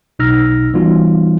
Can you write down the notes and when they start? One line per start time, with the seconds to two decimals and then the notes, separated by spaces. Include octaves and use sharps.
0.19 B1 B2 D#4 E6 F6 A#6
0.74 E3 G3 B3 D#4 F4 F#4